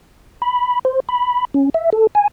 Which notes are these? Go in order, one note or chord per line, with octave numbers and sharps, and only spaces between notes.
B5
C5
B5
C#4
E5
A4
G#5